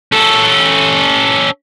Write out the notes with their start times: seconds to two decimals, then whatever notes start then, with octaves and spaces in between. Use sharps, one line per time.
0.12 C#4 A4